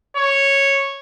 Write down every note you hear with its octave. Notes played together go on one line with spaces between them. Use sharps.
C#5